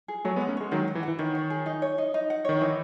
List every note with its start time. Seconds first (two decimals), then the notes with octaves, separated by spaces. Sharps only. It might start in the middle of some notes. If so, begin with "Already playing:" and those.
0.08 G#4
0.25 F#3 A3 C#5
0.36 G#3 B3
0.41 F#5
0.48 A3 C#4
0.57 G#3 C#5
0.71 D#3 F#3 F#5
0.88 F#5
0.95 E3
1.03 F#5
1.08 E3
1.19 D#3 C#5
1.35 C#5
1.50 G#4
1.66 D#4
1.82 C#5
1.98 D#4
2.14 D#4
2.30 F#5
2.45 D#3 C#5
2.61 E3 D#4